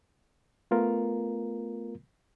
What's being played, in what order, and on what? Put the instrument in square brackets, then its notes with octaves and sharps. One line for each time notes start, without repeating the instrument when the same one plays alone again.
[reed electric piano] A3 B3 F4 A#4